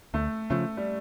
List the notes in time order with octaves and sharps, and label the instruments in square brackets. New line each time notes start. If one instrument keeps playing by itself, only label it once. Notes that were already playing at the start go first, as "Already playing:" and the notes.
[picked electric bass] D2 [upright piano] A3
[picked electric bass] C#3 F3 [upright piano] A3
[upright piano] G3